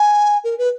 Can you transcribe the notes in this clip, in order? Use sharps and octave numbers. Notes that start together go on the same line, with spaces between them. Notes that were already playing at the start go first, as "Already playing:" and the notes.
Already playing: G#5
A#4
B4